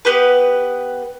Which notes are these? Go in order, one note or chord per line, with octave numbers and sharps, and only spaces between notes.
B3 G4 B4